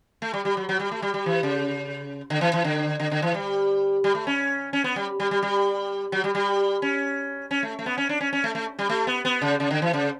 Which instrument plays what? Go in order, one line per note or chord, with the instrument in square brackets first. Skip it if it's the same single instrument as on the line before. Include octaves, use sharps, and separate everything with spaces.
[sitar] A3
G3
G3
F#3
F#3
G3
A3
G3
G3
E3
C#3
D3
E3
E3
D3
D3
D3
E3
G3
G3
A3
C#4
C#4
B3
G3
G3
G3
G3
F#3
G3
G3
C#4
C#4
A3
A3
B3
C#4
D4
C#4
C#4
A3
A3
G3
A3
B3
B3
C#3
C#3
D3
E3
C#3